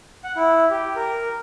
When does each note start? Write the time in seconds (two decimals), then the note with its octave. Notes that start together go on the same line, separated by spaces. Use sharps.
0.24 F#5
0.37 E4
0.70 G4
0.96 A#4